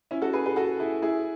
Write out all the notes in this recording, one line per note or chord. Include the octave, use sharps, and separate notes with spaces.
C#4 E4
F#4 A4
G#4 B4
G#4 B4
F#4 A4
E4 G#4
E4 G#4